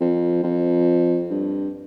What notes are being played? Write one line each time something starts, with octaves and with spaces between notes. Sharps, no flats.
F2
F2
G2